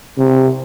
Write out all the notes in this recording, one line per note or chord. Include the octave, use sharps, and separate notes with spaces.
C3